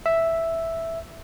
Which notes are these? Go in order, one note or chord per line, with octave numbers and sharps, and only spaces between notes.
E5